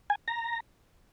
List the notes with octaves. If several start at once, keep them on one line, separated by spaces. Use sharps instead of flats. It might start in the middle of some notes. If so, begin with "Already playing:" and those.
G#5
A#5